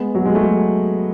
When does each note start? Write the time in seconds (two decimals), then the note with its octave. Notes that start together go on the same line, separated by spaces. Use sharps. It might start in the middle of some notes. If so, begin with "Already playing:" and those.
Already playing: G#3 B3
0.15 F#3
0.25 G#3
0.35 F#3 A3